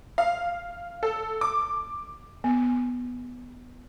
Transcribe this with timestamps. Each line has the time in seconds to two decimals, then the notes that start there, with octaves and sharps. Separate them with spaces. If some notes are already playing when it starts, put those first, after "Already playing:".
0.18 F5
1.03 A4
1.41 D6
2.44 B3